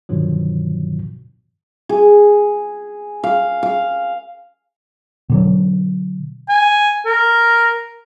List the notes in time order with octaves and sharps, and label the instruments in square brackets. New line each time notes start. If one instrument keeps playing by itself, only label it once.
[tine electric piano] G2 B2 D3 D#3 F3 F#3
[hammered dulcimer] G#4
F5
F5
[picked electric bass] B2 D3 F#3
[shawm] G#5
A#4